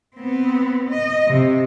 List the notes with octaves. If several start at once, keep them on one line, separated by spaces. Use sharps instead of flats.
B3 C4
D#5
C3